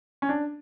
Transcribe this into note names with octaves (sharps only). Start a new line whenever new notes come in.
C#4
D4